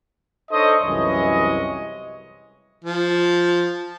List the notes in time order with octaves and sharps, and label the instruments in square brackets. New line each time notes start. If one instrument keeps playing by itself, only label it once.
[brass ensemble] D4 D#4 A4 C5 C#5 D#5
C2 F#2 E3 G#3 C#5 D#5
[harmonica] F3